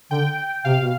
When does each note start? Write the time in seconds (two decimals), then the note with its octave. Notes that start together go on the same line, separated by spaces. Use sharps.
0.11 D3 G5
0.65 C3 F5
0.81 B2